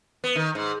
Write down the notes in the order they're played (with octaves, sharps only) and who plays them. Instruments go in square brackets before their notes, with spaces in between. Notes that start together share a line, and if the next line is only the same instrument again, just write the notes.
[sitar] B3
D#3
G#2